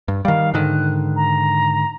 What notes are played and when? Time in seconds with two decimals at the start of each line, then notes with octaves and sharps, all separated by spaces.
0.08 G2
0.25 D#3 G3 F5
0.54 G#2 D3 D#3 F#6
1.16 A#5